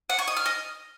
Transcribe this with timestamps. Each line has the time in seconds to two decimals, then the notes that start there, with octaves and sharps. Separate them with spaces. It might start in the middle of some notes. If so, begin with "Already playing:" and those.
0.10 F#5
0.19 C#6
0.28 D#5
0.37 F6
0.46 D#5